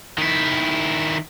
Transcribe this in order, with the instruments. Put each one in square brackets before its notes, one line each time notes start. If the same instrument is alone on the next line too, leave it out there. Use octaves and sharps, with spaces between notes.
[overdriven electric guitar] D#3 E4